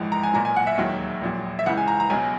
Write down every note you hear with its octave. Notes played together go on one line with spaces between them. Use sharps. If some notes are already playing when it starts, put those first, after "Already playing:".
Already playing: A#1 G#2 E3
A#5
G#5
B1 A#2 F#3 A#5
G#5
F#5
E5
E1 D#2 D#3 F#3
A#1 A#2 F#3
E5
C#2 C#3 E3 F#5
G#5
A#5
A#5
B1 B2 F#3 G#5